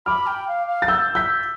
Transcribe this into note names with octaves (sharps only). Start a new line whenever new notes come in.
B5 D6 F6
G5
F5
F5
A6
E6 G6
G6 B6